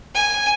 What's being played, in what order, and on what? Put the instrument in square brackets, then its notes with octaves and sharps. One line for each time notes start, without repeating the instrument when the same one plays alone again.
[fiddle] G#5